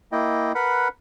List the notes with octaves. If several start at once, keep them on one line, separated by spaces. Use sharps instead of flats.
A#3 E4 D#5 G5
A#4 B4 F#5 B5